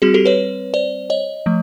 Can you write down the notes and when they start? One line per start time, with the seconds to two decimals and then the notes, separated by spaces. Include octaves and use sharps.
0.02 G3 C4 F#4 G#4
0.14 G4 A4
0.26 B4 C#5
0.74 C5 D5
1.10 C#5 D#5
1.46 F3 A3